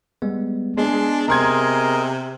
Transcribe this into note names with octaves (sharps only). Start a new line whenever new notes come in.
G3 G#3 B3
G#3 B3 D4 C6
C3 G#4 A#4 D#5 A#5 C6 G#6